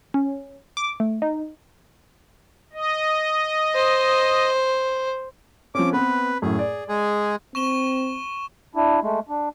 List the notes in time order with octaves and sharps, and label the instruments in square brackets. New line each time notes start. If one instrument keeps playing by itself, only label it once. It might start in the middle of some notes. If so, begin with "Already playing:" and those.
[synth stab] C#4
D6
A3
D#4
[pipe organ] D#5
[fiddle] C5
[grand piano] F3 C4 C#4 [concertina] D6
[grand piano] B3 C4 [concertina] B4
[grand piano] F#2 A2 [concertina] G#4
[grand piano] D5
[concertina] G#3 G#4
[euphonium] C4 [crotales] C#6 E7 G7
[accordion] D4 E4
G#3 A3
D4